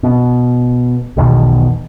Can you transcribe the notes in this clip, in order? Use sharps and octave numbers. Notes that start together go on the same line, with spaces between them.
B2
B1 E2 B2 D#3